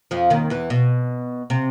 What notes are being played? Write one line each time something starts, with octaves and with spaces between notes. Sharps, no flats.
F2 F3
D#2 D#3
E2 E3
B2
C3